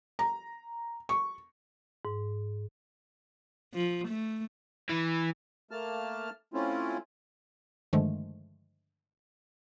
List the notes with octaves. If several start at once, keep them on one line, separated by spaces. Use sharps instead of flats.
A#5
C#6
G#2
F3
A3
E3
A3 A#3 A5 F6
A3 C4 C#4 E4 F4
G2 D3 D#3 F3 G#3 A3